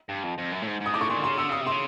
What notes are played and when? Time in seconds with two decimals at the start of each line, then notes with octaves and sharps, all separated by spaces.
0.09 G2
0.23 F2
0.38 F2
0.52 F#2
0.62 A2
0.67 G#2
0.80 G#2
0.86 D#6
0.94 A2 D6
1.01 C#6
1.09 A#2 C6
1.17 D3
1.24 C#3 C6
1.38 D3 E6
1.49 C#3 D#6
1.61 C3
1.67 C6
1.72 C#3